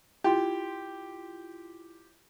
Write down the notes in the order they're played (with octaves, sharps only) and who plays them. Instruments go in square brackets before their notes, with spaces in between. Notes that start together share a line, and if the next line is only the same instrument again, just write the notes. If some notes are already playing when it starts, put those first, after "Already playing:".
[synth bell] E4 F4 C6 [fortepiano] G4